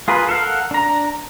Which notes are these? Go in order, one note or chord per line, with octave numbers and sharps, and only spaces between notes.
F4 G#4 A#4 B4
A4 A#4 F5 F#5
D4 A#5